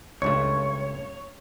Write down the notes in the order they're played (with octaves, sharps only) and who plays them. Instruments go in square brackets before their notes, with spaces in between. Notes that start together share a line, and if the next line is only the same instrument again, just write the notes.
[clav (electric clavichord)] C#2 G2 A3 [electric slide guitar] C#5